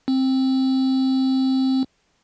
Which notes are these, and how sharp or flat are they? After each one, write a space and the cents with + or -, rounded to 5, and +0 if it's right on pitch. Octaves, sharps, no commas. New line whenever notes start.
C4 +10